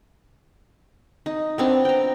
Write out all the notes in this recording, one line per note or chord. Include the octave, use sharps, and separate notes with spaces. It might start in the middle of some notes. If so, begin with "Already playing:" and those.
D#4
B3 C4 D4
G5 A#5